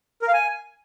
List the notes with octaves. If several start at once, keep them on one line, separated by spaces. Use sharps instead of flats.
A#4
F5
G#5